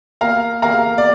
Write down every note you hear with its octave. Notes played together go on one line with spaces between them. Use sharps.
A#3 F5 A#5
A#3 F5 A#5
D5